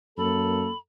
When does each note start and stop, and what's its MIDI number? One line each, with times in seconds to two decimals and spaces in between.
0.18 0.67 42
0.18 0.69 58
0.18 0.70 69
0.18 0.78 83